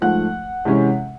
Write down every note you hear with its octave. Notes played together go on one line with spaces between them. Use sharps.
G#2 F3 A3 F#5 F#6
C3 E3 G#3 C#4